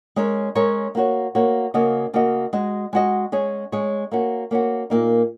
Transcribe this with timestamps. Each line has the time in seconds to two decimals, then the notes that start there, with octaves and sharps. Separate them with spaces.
0.16 G#3 C#4 A#4 C#5
0.55 G#3 C#4 A#4 C#5
0.95 A#3 F#4 C#5
1.35 A#3 F#4 C#5
1.74 C#3 A#3 F#4 D#5
2.14 C#3 A#3 F#4 D#5
2.53 G#3 F#4 D#5
2.93 G#3 F#4 D#5
3.32 G#3 C#4 G#4 C#5
3.72 G#3 C#4 G#4 C#5
4.12 A#3 C#4 F#4
4.51 A#3 C#4 F#4
4.90 A#2 A#3 D#4